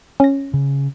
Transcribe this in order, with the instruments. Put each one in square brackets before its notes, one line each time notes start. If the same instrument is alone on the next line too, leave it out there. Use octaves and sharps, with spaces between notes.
[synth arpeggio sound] C#4 A#6
[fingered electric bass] C#3